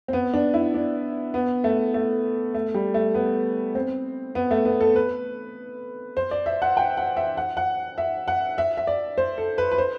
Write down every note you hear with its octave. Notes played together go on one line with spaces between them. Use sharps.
C4
B3
D4
E4
D4
B3
A3
A3
A3
G3
A3
B3
C4
B3
A3
B3
A4
B4
C5
D5
E5
F#5
G5
F#5
E5
F#5
F#5
E5
F#5
E5
E5
D5
C5
A4
B4
B4
C5